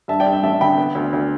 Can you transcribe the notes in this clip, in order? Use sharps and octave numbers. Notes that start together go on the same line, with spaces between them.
G2 E5 A5
D5 G5
G2
E5
A1 E5 A5
D3 G5 B5
B3
D2
D2